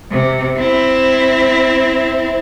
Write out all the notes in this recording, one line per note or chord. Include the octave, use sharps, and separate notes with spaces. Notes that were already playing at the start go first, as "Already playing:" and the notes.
C3
C4 E4